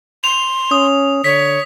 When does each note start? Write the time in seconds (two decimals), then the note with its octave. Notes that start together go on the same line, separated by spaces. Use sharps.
0.24 C6 F7
0.71 C#4 D#6
1.24 D3 C#5 B6